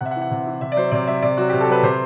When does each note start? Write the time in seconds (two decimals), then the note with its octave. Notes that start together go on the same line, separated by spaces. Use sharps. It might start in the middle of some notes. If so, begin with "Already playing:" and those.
0.01 C3 E5 F#5
0.11 F#5
0.16 E3
0.21 F#5
0.31 C3
0.46 E3
0.61 C3 E5
0.72 D5
0.76 F#3 C5
0.91 C3 D5
1.07 F#3 E5
1.22 C3 D5
1.37 F#3 F#4
1.49 C3 G4
1.61 A4
1.68 F#3 B4
1.83 C3 C5